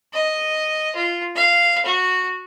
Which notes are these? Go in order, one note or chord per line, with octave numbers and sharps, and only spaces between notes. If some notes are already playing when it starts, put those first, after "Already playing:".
D#5
F4
F5
F#4